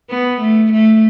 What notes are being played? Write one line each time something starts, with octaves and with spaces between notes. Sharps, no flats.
B3
A3
A3